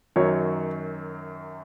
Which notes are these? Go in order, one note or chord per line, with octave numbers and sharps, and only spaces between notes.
F#2 D#3 F#3 C#5